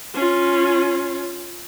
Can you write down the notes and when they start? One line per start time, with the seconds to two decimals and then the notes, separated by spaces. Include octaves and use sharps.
0.14 C#4 F4